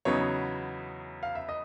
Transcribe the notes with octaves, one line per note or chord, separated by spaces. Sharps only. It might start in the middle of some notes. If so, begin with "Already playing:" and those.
E2 C#3 F#3 B3 D#4 C#5
F5
E5
D#5